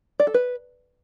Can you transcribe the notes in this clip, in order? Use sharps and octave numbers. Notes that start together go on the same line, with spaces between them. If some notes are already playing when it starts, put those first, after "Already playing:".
D5
A4
B4